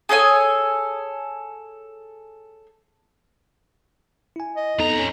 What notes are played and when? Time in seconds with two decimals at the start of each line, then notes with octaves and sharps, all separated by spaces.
0.09 G#4 A4 C#5 G#5
4.36 E4 G#5
4.56 D#5
4.79 F2 B3 D#4 A4 A#5
4.98 C#4